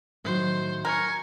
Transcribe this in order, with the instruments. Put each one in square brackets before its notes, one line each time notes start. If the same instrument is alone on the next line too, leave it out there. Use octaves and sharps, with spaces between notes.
[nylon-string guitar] A2 D#3 F#3 [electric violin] C5
[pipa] A#4 [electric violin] G#5 C#6